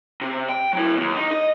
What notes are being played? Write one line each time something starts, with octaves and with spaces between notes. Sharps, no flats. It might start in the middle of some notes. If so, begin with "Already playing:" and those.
C3
G5
F#3 E4
D#2 B2
D#4
D#5